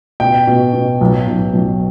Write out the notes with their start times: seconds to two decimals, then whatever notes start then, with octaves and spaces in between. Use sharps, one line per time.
0.20 B2 G5
0.47 B2
0.73 B2
1.01 B1
1.27 B1
1.53 B1